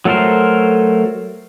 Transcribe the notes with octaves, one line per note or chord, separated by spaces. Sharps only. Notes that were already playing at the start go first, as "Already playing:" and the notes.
F#3 A3 A4 A#4 C5